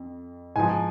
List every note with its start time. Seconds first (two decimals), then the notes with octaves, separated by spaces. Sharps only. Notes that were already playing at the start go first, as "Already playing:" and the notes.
Already playing: F2
0.56 G#2 F3 G#5